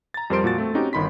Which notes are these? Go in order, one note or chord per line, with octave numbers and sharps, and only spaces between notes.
A#5 A6
F2 G3 A#4 C5 C6 D7
A#2 F3 F#4 A6
A3 C4
C4 C#4 D#4 F#4 G4
G1 D#3 B5 C6 B6